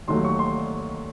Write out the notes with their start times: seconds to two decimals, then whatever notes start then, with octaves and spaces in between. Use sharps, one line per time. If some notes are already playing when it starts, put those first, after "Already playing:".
0.08 D#2 D#3 F#3 A3 C6
0.25 C#6
0.39 C6